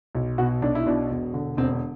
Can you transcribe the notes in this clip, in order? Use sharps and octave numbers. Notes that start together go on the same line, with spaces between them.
B1
B2 F#4
B1 D4
E4
B2 D4
E1
D3
E1 C4